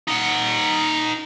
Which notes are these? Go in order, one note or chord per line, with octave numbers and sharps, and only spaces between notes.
D#4 F#5